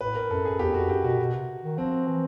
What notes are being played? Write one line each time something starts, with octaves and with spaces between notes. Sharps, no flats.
A2 B4
A#4
F#2 A4
G#4
E2 G4
F2 F#4
F#2 G4
B2 F#4
B2
C3
D#3
F3 C4
E3